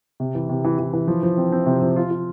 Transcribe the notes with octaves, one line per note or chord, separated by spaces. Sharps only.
C3
E3
C3
E3
E3
E3
F3
F3
C4
C4
C3
F3
F4
F4